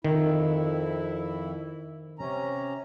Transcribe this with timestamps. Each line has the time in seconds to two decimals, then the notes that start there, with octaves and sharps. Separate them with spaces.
0.04 F2 D#3 E4
2.19 C3 C#4 A#5